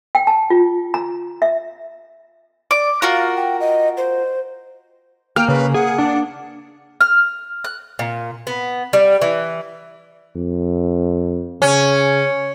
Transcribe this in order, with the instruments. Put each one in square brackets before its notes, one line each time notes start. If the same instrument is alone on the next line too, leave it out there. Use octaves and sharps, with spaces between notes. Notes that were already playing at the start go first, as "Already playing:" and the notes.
[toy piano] G5
A5
F4
A#5
E5
[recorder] D5 [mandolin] D6
[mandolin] F4 F#4 A#4 [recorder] F5
[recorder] G5
D#5
C5
[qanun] A#3 [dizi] G5 [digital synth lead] F6
[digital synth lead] C#3 [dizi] B4
[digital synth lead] G#4 [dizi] F#5
[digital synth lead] D4
[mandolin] F6
F#6
[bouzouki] A#2
B3
G3
E3
[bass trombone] F2
[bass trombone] C#3 [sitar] C#4